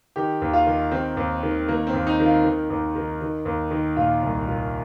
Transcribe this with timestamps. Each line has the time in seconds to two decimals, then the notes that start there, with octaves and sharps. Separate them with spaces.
0.16 D#3 G4
0.41 D#2
0.53 F4
0.67 D#3
0.91 D#3 C4
1.17 D#2
1.43 D#3
1.68 D#3 A#3
1.87 C4
1.93 D#2
2.07 D#4
2.20 D#3
2.26 F4
2.44 D#3
2.70 D#2
2.96 D#3
3.21 D#3
3.45 D#2
3.71 D#3
3.97 A#2 F4
4.23 C2
4.47 A#2